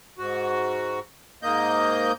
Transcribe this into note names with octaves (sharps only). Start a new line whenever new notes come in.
G#2 F#4
G#2 A#3 D#5 G6